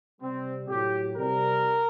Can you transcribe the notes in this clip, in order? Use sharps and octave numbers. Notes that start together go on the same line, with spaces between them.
C3 G3 C4
A2 F#3 G4
C3 G3 A#4